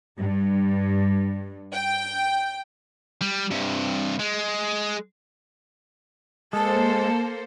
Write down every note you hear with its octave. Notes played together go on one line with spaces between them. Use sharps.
G2
G5
G3
G2 C3
G#3
G#3 A#3 A4 C5 A5